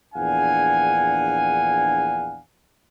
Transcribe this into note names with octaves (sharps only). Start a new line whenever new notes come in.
A#1 E2 D4 F5 F#5 G#5